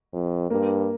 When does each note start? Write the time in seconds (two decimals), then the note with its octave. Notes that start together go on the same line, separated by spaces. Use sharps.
0.13 F2
0.50 G2 A#3